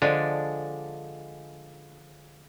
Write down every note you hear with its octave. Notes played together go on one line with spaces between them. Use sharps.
D3 F3 G#3 D4